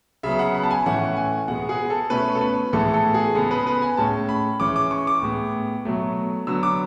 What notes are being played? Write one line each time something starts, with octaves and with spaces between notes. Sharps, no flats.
C#3 F#3 B3 E5
F#5
B5
A5
G#5
A2 E3 A3 C#4 F#5
G#5
B2 G#3 B3 F#5
G#4
A4
B2 A3 C#4 B4
A4
B4
A2 E3 G#3 B3 A4
A4
G#4
C#3 G#3 B3 A4
B4
B4
G#5
A2 G#3 C#4 A5
B5
E3 G#3 C#4 D6
D6
C#6
D6
A2 G#3 B3
B2 F#3 A3
D3 F#3 B3 E6
D6